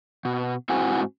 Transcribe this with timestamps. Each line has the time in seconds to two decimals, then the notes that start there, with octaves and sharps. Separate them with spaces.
0.25 B2
0.69 G#2 C4 E4 F#4 F#5 G#5